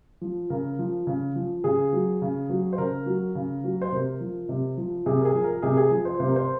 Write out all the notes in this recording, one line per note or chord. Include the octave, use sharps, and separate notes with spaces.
F3
C#3 A#4
F3
C#3
F3
C#3 G#4
F#3
C#3
F#3
C5
C#3 A#4
F#3
C#3
F#3
C5
C3 A#4
F3
C3
F3
C3 G#4
A#4
G#4
F3
A#4
C3 G#4
G#4
F3
C5
C3 C5
A#4
C5